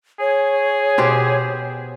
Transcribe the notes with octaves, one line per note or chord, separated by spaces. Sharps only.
G#4 C#5
B2 G4 C5